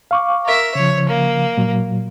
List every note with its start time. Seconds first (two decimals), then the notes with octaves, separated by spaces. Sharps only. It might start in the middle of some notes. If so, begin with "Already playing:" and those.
0.11 F5 C#6 D6
0.45 A#4 E5
0.75 C#3 F3 C#5
1.09 A#3
1.57 A#2 F#3